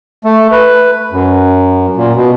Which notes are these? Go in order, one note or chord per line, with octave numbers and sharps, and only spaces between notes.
A3
B4
F#2
A#2
B2